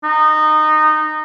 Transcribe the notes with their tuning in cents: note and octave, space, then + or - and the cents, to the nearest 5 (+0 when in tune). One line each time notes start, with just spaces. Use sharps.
D#4 -20